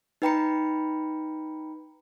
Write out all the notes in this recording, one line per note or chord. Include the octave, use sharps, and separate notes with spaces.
D#4 B4 G5 A#5 B5 C#7